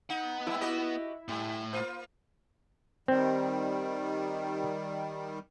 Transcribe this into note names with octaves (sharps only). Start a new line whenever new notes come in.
B3 D#4 F#5
F3 G3 E4 E5
F#4 G4 D#5
A2 G3 A3
A#3 F4 C5
D#3 G3 C4